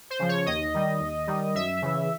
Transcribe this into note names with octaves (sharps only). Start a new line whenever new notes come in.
C5
C#3 F3
C#5
D#2 D#5
D#3 G3
D#2
D#3 G3
F#2 E5
C#3 E3